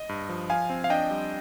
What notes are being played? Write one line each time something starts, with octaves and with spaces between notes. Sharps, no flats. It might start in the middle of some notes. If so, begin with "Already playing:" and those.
Already playing: D#5
G2
F3
F3 F5 G#5
C4
F5
D4 D#5 G5
G3